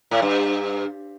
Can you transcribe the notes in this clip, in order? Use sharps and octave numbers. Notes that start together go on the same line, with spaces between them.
A2
G2